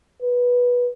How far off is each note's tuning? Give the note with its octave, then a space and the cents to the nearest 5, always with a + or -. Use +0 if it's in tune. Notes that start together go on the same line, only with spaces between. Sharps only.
B4 -15